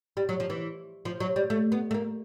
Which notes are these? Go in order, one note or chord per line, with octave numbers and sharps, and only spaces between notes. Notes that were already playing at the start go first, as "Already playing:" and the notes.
G3
F#3
F3
E3
F3
F#3
G3
A3
B3
A3
A#3